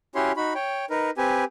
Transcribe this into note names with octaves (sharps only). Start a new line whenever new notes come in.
C#4 E4 F#4 G4 C#5 C6
D#4 F#4 B5
C#5 G5
D#4 A#4 B4
C4 G4 B4 G#5